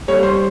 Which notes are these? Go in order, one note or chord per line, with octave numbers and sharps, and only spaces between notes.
G3 C#5
C5